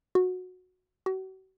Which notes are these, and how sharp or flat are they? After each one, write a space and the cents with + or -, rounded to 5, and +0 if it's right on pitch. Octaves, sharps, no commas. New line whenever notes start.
F#4 -15
F#4 +40